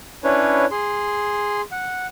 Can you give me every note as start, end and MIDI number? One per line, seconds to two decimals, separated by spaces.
0.24 0.65 61
0.24 0.65 62
0.24 0.65 64
0.24 0.65 71
0.24 0.65 73
0.71 1.61 68
0.71 1.61 84
1.72 2.07 78